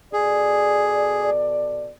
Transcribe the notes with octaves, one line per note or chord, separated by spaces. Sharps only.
B2 G#4 A4 D5